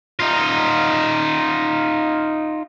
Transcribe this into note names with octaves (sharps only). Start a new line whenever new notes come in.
D#4 F4